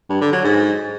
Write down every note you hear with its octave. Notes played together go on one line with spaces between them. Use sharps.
G2
D3
F#3
G#2